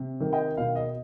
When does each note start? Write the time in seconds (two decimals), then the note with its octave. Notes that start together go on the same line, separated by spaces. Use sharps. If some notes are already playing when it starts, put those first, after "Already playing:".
Already playing: C3
0.20 D#3
0.33 D#5 G5
0.57 B2 F5
0.75 D#5